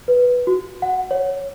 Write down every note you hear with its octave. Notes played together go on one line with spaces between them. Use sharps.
B4
F#4
F#5
C#5